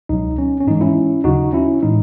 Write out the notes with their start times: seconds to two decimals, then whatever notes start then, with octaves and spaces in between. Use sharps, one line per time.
0.09 C#2 B2 F#3 D#4
0.38 C#4
0.60 C#4
0.67 G#2 E3 G#3 D#4
0.81 C#4 E4
1.24 D#2 C#3 F#3 D#4 F#4
1.53 C#4 E4
1.82 A2 E3 G#3 D#4